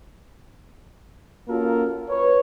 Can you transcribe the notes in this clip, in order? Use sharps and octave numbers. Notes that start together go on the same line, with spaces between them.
A#3 C#4 F4 F#4 A4 A#4
B4 C#5